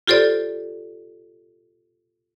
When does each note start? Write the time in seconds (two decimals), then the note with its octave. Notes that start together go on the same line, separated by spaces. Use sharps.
0.07 F4 G4 A4 C5 D5